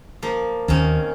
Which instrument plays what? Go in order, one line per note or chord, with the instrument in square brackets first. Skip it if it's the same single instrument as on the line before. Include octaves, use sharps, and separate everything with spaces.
[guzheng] F3 A#3
[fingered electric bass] D#2 [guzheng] D#3 C4 C#4